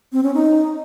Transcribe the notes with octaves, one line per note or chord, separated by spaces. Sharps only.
C4
C#4
D#4